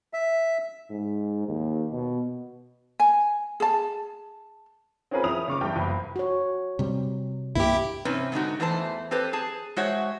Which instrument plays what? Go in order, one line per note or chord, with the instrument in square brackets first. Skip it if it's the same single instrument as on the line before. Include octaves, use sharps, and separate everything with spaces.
[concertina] E5
[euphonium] G#2
D#2
B2
[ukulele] G#5
G#4 A5
[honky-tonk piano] C4 C#4 F4 G#4 A#4 B4
F2 C#4 E4 D#6 F7
C#3 C#6 D6
E2 G2 E4 G5
F#1 B5
[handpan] F#4 C#5
[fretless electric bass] C3 G3
[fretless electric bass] C2 G2 A#3 [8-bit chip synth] E4 G4
[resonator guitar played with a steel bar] C3 C4 C#4 D#4 B4
G#2 D3 D#4 F#4
E2 E3 A3 C5 A5
C4 G4 A4 B4 C5
G#4 A5
G#3 F#4 C5 C#5 E5 F#5